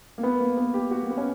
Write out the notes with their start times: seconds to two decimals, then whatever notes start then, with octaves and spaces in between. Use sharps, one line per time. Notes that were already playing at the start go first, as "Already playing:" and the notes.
0.18 A#3
0.23 B3
0.40 A#3
0.57 B3
0.74 G4
0.91 F#4
1.03 A#3
1.11 B3
1.18 C#4